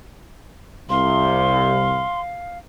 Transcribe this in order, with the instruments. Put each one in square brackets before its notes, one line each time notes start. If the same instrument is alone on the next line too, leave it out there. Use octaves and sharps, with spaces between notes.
[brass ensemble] C2 C3 [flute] F5 [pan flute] C6